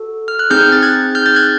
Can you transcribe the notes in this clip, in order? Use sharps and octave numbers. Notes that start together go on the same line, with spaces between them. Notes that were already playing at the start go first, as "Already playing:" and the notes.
Already playing: F#4 A4
F6
F#6
C4 D#4 G#4 F6 G6
A6
F#6 G#6
F6 G6
G6 A6
F#6 G#6